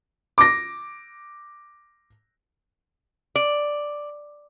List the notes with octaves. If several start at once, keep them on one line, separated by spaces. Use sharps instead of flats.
D6 A#6
D5